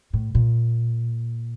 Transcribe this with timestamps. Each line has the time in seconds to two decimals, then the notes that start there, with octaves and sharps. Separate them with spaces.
0.13 A2
0.35 A#2